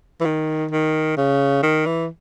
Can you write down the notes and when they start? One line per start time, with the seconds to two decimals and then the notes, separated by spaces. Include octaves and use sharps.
0.21 E3
0.25 D#3
0.71 D#3
1.17 C#3
1.62 D#3
1.86 E3